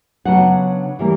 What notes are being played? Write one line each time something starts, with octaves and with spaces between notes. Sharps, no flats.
C#3 F#3 B3 D4 F#5
E3 G3 A#3